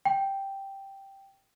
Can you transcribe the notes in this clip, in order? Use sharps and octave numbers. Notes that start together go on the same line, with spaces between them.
G5